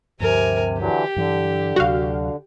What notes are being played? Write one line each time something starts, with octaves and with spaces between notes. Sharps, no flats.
D2 G2 C3 F3 A#4 G#5
D3 E3 F#3 G4
G2 D3 E3 F#3
D2 C3 F#3 F#4 F5